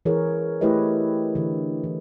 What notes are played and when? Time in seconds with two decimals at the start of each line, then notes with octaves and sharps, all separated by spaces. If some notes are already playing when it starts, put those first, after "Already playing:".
0.05 E3 E4 G#4 A#4 C#5
0.61 A3 E4 G4 B4 C#5 D#5
1.35 D3 E3
1.84 E3